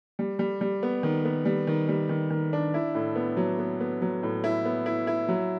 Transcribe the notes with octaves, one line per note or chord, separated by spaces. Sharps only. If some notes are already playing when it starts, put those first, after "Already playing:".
G3
G3
G3
B3
D#3
B3
G3
D#3
G3
D#3
D#3
D4
E4
A2
B3
F#3
B3
B3
F#3
A2
E4
B3
E4
E4
F#3